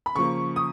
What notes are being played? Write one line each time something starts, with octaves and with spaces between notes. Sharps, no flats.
B5
C#3 F3 A#3 C#6
D#6